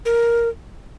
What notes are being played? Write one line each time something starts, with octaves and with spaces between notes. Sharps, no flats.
A#4